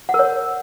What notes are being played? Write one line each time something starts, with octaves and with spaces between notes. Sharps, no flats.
F#5
A#4
C#5